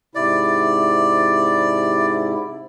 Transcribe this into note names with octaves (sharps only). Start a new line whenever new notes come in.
G#2 C3 E4 D5